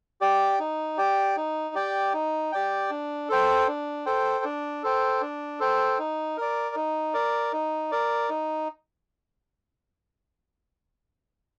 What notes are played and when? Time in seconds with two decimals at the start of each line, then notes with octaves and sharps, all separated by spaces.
0.21 G4 D5 G5
0.59 D#4
0.98 G4 D5 G5
1.36 D#4
1.75 G4 D5 G5
2.13 D#4
2.52 G4 D5 G5
2.90 D4
3.29 A4 C5 G5
3.67 D4
4.06 A4 C5 G5
4.44 D4
4.83 A4 C5 G5
5.21 D4
5.60 A4 C5 G5
5.99 D#4
6.37 A#4 D5
6.76 D#4
7.14 A#4 D5
7.53 D#4
7.91 A#4 D5
8.30 D#4